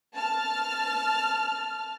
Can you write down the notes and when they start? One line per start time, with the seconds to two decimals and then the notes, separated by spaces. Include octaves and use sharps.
0.14 A5 F6